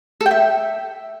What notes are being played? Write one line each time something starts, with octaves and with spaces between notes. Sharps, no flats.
A4
G5
E5